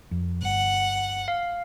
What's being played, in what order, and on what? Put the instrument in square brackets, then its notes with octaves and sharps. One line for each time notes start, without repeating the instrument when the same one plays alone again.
[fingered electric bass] F2
[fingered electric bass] G1 [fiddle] F#5
[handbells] F5